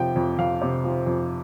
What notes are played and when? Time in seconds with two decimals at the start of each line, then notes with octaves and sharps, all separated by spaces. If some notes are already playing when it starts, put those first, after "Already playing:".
Already playing: F2 C3 F3 G5
0.16 F2
0.39 F2 F5
0.61 C3
0.84 F3
1.06 F2